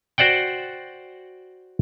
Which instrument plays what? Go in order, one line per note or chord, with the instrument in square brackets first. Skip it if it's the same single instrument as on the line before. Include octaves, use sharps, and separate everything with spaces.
[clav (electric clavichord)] F#4 C5 D5 F#5 G5